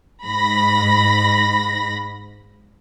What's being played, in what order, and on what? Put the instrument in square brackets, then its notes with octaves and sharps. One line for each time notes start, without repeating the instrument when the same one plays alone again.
[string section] G#2 B5 A#6